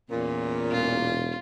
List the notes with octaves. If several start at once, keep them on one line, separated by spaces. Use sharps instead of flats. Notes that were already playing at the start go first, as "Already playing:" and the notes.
E2 A#2 C#4
E1 F4